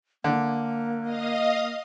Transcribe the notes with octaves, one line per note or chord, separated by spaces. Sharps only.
D3 A#3
D#5 F5 D#6